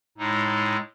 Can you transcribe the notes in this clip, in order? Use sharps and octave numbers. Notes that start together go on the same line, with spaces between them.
A2 G#3 D#4